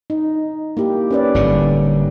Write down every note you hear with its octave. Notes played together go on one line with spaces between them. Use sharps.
D#4
A#3 E4 G4
C#4 B4 D5
G1 A2 D3